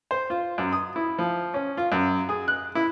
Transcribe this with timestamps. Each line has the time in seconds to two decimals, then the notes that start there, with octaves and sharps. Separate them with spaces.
0.11 C5
0.30 F4
0.58 F#2
0.73 D#6
0.96 E4
1.19 F3
1.54 C#4
1.77 F4
1.92 F#2
2.29 G#4
2.48 F#6
2.75 E4